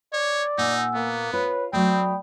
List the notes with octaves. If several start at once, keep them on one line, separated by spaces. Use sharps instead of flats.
C#5 D5
A#2 D#4 F#5 G#5 E6
A#3 B3
F4 B4 C#5
F#3 A3 C4 D5 G5 B5 D#6